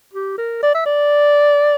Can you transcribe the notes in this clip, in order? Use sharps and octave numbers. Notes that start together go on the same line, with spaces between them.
G4
A#4
D5
E5
D5